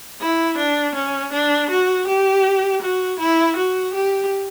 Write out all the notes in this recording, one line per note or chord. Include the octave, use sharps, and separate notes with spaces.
E4
D4
C#4
D4
F#4
G4
F#4
E4
F#4
G4